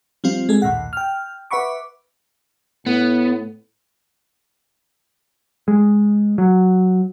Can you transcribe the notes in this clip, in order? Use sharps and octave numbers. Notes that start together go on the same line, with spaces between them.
F3 G3 C4 F4
G#3 G#4 A4
A#1 D#2 A2 F#5
G5 F6
B4 E5 F#5 B5 C#6 D6
A2 B3
G#3
F#3